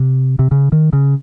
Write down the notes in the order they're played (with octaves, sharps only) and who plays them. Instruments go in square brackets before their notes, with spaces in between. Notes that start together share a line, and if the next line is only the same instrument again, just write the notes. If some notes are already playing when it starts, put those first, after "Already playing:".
Already playing: [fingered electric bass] C3
C3
C#3
D#3
C#3